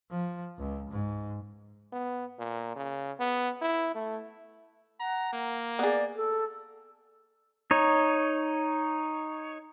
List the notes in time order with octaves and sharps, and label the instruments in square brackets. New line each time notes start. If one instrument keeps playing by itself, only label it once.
[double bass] F3
C#2
G#2
[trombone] B3
A#2
C#3
B3
E4
A3
[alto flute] F#5 [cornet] A#5
[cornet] A#3
[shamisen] B3 G#4 [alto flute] D5
[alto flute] A4
[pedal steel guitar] D#4 C#5